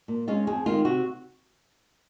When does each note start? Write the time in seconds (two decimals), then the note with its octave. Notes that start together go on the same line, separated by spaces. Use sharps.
0.08 A#2
0.28 G#3 C#4 F4
0.47 F2 G#4
0.66 D#3 G#3 D#4 F4
0.85 C3 F#4